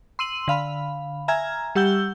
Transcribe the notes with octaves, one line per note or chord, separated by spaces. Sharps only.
C6 E6 D#7 F#7
D3 F5 B5
E5 G#5 A#5 F6 G#6
G3 G4 F#5 E6 G6 G7